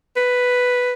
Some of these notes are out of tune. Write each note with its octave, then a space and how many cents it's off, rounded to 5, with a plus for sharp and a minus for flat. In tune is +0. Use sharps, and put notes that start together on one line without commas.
B4 +0